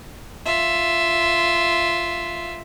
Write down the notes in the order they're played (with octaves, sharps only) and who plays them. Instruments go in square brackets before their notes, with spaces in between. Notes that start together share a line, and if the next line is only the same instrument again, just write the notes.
[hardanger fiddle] F4 E5